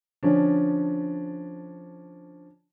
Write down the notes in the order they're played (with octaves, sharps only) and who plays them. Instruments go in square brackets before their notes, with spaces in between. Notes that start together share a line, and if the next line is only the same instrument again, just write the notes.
[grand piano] D3 F3 C#4 D4